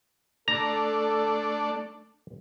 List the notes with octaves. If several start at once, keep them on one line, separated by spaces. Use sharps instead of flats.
A3 D4 A4 A#5